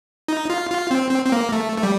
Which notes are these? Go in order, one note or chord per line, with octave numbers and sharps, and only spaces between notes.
D#4
F4
F4
C4
C4
C4
A#3
A3
A3
G3